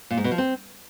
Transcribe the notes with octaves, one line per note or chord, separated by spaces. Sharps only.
A#2
G#2
B2
F3
C4